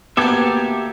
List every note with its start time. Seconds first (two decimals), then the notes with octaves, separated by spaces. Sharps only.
0.17 D2 A#3 B3 G4 A4 E5 D6 G#6